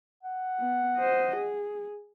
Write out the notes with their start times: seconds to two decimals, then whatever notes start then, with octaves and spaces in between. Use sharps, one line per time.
0.23 F#5
0.60 B3
0.97 C5 D#5
1.36 G#4